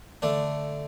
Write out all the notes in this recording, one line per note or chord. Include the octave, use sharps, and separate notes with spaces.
D3 A3 D4